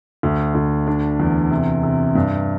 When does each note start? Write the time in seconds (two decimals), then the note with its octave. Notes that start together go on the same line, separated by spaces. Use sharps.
0.23 D2
0.55 D2
0.87 D4
1.20 E2
1.51 C3
1.83 C3
2.15 G2